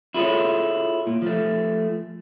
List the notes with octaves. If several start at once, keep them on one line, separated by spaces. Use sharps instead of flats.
E4 F4 G#4 A4 C#5
A#2
F3 A3